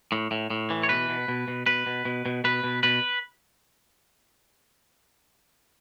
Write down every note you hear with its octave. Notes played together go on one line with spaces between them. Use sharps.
A2
A2
A2
E3
C#5
B2 B4
B2
B2
B2
B2 B4
B2
B2
B2
B2 B4
B2
B2 B4